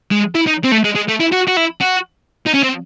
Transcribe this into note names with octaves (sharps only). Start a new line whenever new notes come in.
G#3
E4
D#4
C4
A3
G#3
G#3
A3
E4
F#4
F#4
E4
F#4
D#4
C#4
C4